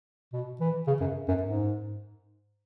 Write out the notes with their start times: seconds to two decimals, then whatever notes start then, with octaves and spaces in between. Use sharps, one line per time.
0.33 B2
0.60 E3
0.87 C#3
1.01 F#2
1.28 F#2
1.42 G#2